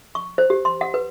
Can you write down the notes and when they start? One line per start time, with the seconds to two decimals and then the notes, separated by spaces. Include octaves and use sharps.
0.15 C#6
0.38 C5
0.50 G4
0.65 C6
0.81 F#5
0.94 B4